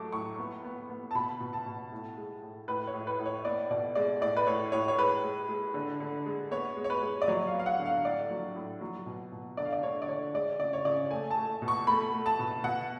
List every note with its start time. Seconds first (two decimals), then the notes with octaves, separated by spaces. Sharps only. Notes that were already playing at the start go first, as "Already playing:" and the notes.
Already playing: F#3 A3 D6
0.12 A2 C#6
0.38 B3
0.64 B3
0.90 B3
1.11 A5
1.15 B2 B5
1.40 B2
1.53 A5
1.66 B2
1.92 A2
2.17 G#3
2.43 A2
2.68 A2 B4
2.87 C#5
2.94 A2
3.07 B4
3.19 A2
3.26 C#5
3.45 B3 D5
3.70 B2 D5
3.95 G#3 D5
4.21 A2 D5
4.37 B4
4.47 A2 C#5
4.72 A2 C#5
4.88 C#5
4.98 G#3 B4
5.24 G#3
5.49 G#3
5.74 D3
6.00 D3
6.26 G#3
6.51 B3 C#5
6.76 G#3
6.84 C#5
6.90 B4
7.02 G#3
7.22 D5
7.28 F#3 C#5
7.47 F5
7.53 B3
7.59 F5
7.66 F#5
7.79 D3
7.86 F5
8.04 A2 D5
8.30 F#3
8.56 A2
8.81 F#3
9.06 B2
9.32 B2
9.57 D3 D5
9.65 F5
9.73 D5
9.83 D3 C#5
10.02 D5
10.08 D3 C#5
10.34 G#3 D5
10.59 C#3 D5
10.73 C#5
10.85 C#3 D5
11.11 A3 G#5
11.31 A5
11.37 A3
11.62 B2
11.68 C#6
11.87 A3 B5
12.13 A3
12.26 A5
12.39 B2
12.64 B2 F#5